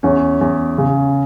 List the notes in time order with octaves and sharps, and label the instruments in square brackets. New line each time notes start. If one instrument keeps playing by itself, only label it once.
[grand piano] E2 [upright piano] C#4
[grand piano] E2
C#3